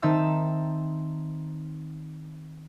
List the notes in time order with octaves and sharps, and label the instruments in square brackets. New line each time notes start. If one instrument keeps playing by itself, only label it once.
[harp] D#3 C4 D#4 E5 A5 E6